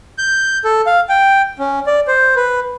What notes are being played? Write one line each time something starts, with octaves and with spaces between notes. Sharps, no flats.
G6
A4
F5
G5
C#4
D5
C5
B4